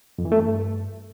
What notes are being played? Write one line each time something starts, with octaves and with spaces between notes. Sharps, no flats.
F2
E3
A3
G2